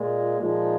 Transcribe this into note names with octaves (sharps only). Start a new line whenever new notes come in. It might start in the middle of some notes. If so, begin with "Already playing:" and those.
Already playing: A#2 G#3 F4
A#2 F3 G#3 D#4